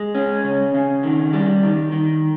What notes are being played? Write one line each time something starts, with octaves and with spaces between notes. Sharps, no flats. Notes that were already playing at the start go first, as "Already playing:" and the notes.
Already playing: G#3
C#4
C#3
C#3
D#3
G3
D#3
D#3